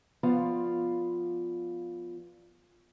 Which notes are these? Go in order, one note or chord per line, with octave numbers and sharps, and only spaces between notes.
F3 B3 F4 D5 F5